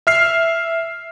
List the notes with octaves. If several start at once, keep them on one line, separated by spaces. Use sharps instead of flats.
E5 F6 C7